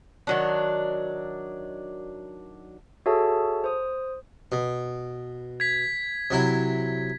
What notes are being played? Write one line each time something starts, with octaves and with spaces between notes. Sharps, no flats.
D#3 F#3 D4
F#4 G#4 A4 C#5 E5 A5
C5 D#6
B2
G#6 B6
C3 F#3 E4